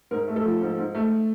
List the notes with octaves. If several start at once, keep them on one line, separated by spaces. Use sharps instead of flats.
G#2 A#4
A3
A4
F3
G#2
G#2
A3